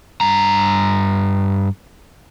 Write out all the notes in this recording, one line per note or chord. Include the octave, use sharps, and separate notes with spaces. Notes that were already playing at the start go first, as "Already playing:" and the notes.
G2 A#5